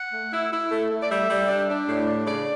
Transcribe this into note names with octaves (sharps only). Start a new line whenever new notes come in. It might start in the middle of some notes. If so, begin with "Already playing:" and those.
Already playing: F#5
A3
E4
E4
A3
A3
D5
G3 E5
G3
D4
D4
A2
D4
C#3 D5